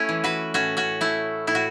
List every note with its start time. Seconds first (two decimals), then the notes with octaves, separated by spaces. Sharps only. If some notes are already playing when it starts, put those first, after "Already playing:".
Already playing: A3 C#4 E4
0.09 E3
0.24 F#4 B4
0.54 A2 C#4 F#4
0.77 C#4 F#4
1.01 A3 E4
1.47 A2 E4
1.55 F#4